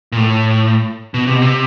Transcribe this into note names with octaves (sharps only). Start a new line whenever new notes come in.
A#2
A2
B2
C3
B2
C3